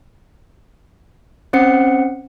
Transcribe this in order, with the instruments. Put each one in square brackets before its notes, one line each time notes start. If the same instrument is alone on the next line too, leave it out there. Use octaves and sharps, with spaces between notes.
[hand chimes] C4 C#4 C5 F#5 C#7